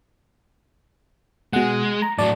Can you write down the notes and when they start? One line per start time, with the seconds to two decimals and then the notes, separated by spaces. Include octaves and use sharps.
1.53 B2 G#3 F#5
2.02 A#5
2.18 A2 F#3 D5 A5